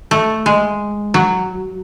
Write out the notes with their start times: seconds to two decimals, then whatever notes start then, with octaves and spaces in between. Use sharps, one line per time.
0.11 A3
0.46 G#3
1.14 F#3